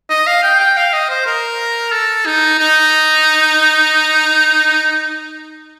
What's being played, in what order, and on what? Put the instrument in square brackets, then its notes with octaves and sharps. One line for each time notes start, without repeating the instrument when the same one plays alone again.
[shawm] D#5
F5
G5
G5
F5
D#5
C5
A#4
A4
D#4
D#4